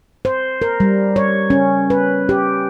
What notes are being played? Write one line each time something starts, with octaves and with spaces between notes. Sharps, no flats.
C5
A#4
G3
C#5
C#4
B4
G4